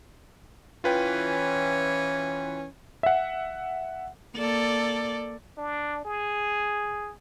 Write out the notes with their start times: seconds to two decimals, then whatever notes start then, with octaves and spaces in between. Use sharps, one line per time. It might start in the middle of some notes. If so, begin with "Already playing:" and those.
0.84 E3 C#4 F4 B4 G5
3.03 E5 F#5
4.36 A#3 A4 D5
5.58 D4
6.05 G#4